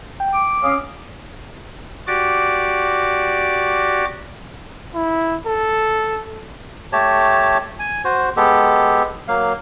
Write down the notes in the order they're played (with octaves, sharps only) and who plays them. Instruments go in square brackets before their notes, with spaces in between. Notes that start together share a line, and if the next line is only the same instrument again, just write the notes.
[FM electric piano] G5
[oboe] D6
[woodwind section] C#4 F5 D#6
[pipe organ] F#4 G4 D5 D6
[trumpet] E4
A4
[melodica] A3 G4 C#5 A5
G#5
F#4 C5
G#3 B3 G4 A4
F#3 A#3 F5